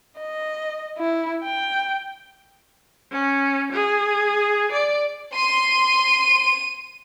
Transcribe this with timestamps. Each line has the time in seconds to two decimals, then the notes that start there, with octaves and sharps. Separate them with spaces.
0.18 D#5
0.97 E4
1.44 G5
3.11 C#4
3.72 G#4
4.72 D5
5.36 C6 D#7